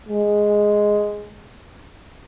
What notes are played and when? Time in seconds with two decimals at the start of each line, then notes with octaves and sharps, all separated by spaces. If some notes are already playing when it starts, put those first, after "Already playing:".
0.09 G#3